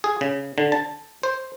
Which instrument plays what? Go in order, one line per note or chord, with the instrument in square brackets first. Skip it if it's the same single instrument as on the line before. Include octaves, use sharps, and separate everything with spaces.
[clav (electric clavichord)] G#4
C#3
D3
A5
C5